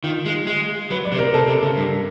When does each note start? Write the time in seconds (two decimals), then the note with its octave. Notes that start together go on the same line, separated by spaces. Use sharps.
0.03 D#3 F4
0.26 G#3
0.47 G#3
0.90 F#3 B4
1.05 D5
1.12 C3
1.19 A#4
1.34 C3 A4
1.48 C3
1.63 C#3
1.77 G2